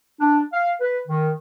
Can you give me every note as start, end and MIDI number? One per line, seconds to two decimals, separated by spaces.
0.21 0.40 62
0.52 0.71 77
0.81 0.97 71
1.08 1.31 51